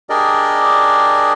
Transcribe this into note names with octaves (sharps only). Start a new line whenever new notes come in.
D4 G4 G#4 A#4 D5 D#5